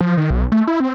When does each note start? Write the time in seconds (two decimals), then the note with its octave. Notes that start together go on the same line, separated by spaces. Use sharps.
0.01 F3
0.17 D#3
0.30 B1
0.52 A3
0.67 E4
0.80 C4